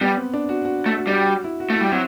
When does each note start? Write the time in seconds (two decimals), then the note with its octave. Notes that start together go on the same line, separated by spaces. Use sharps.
0.01 G3 B3
0.17 C4
0.34 D4
0.49 F#4
0.65 F#4
0.86 A3
0.97 F#4
1.07 G3 F#4
1.28 F#4
1.44 E4
1.60 F#4
1.70 A3
1.76 G3 E4
1.92 F#3 C4